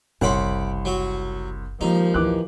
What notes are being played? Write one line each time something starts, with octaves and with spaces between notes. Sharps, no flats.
F#1 C2 C#5 F#5 B5 C6 D6
F#3 F#4
D#2 F3 G#3 D#4
A1 D2 E3 D6 F#6